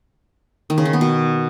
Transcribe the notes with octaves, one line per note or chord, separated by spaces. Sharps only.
D#3
C#3
D#3
B3
B2